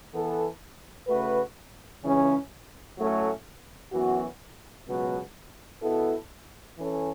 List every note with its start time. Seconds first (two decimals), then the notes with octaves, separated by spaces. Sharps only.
0.13 E3 B3 A4
1.07 C#3 A3 F#4 B4
2.02 C#2 C#3 E3 C#4
2.97 A2 F#3 A3 C#4
3.92 F#2 E3 B3 F#4
4.86 C#2 B2 F#3 B3 F#4
5.82 B2 B3 E4 A4
6.77 E3 C#4 A4